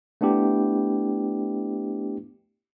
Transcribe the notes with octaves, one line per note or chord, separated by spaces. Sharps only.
A3 B3 D4 E4 G4